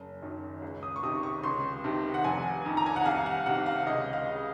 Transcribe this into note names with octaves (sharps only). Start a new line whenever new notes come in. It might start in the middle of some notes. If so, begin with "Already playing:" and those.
Already playing: F#1
F#2 D#3
C#2
D#6
C#6
C3 D#3 D#6
C#6
C#2 C6
C3 D#3
F#5
F1 G#5
F2 D#3
A#5
G#5
F#5
C2 F5
F#5
C3 D#3 F#5
F5
C#2 D#5
F5
C#3